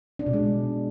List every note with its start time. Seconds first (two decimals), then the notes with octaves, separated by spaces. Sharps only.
0.19 D4
0.26 B2
0.33 G#3